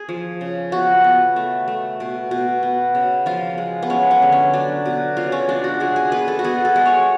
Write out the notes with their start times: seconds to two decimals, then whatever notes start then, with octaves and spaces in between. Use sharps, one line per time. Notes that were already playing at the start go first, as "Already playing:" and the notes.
Already playing: G#4
0.09 F3
0.41 C#3
0.72 B3 F#4
1.04 B3
1.36 A3
1.68 A3
2.00 B2
2.31 B2
2.63 B3
2.95 C#3
3.26 F3 F4
3.58 G#3
3.82 B3
3.90 G#3 C#4
4.11 C#4
4.22 D3
4.32 C#4
4.54 F#3 D4
4.86 B2
5.17 C#3 F4
5.32 C#4
5.49 G#3 D4
5.64 F#4
5.80 G#3 G#4
5.96 G#4
6.12 B3 B4
6.28 A4
6.39 F#4
6.44 B3 G#4
6.65 A4
6.76 G#3
6.86 C#5